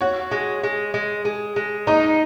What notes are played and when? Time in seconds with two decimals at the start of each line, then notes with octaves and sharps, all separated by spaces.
0.01 F#4 C#5
0.32 G#3
0.63 G#3
0.94 G#3
1.25 G#3
1.56 G#3
1.87 D#4 D#5